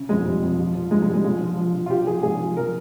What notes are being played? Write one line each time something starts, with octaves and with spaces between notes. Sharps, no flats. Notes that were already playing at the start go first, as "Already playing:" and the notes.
Already playing: C#3
F2 G#3
F2 G3
F2
F3
F3
G#2 G#3
G#3
G#2 G3
G#3
F3 G#3
F3
F3
F3
F4
F3 G4
F3 G#4
G#2 G#4
F3
F3 A#4